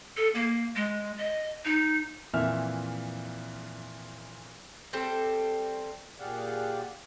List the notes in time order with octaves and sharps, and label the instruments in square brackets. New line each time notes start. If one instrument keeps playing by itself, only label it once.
[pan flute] A4
A#3
G#3
D#5
D#4
[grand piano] F2 A#2 E3 E5 F6
[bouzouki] G3 C4 A4
[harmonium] A#2 G4 G#4 D5 F5 F#5